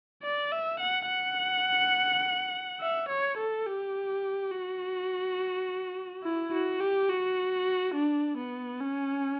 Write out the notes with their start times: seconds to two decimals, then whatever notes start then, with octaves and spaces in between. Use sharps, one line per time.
0.23 D5
0.52 E5
0.80 F#5
1.09 F#5
2.80 E5
3.09 C#5
3.38 A4
3.66 G4
4.52 F#4
6.24 E4
6.52 F#4
6.80 G4
7.09 F#4
7.95 D4
8.38 B3
8.80 C#4